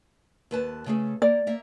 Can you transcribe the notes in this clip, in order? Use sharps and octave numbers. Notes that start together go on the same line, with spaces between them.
D#2 B4 A5
C#3 A3 G#4
A#3 D5
A#3 E5